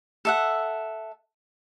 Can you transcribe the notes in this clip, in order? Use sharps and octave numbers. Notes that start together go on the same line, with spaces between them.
A4 E5 F#5